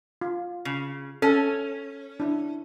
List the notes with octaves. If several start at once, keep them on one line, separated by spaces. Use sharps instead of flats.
F4
C#3
C#4 A4
D4 E4